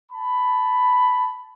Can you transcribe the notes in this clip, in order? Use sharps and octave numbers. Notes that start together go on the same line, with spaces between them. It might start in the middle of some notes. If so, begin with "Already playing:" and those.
A5 B5